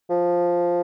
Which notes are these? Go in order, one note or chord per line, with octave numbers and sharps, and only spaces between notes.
F3